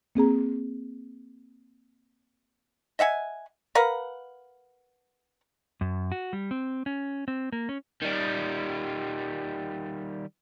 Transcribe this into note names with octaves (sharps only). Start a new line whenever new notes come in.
A#3 C4 G#4 A#5
D#5 E5 F#5 G#5
A#4 B4 F5 F#5
F#2
F#4
G3
C4
C#4
C4
A#3
C#4
D#3 G3